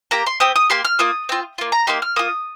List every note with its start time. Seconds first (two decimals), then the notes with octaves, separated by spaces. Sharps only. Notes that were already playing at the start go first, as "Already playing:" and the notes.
0.11 A#3 G4 A#5
0.26 C6
0.40 C4 G4 D#6
0.56 D#6
0.70 A#3 G4 C6
0.85 F6
0.99 A#3 F4 D#6
1.29 C4 F4
1.58 A#3 F4
1.72 A#5
1.87 A#3 D#4 G4 C6
2.02 F6
2.16 A#3 F4 D#6